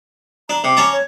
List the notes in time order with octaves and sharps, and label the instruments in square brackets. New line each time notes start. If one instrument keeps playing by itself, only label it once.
[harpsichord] D4 [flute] A#5
[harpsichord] C3 [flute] D6
[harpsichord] C#4 A5 A#5
[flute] C#5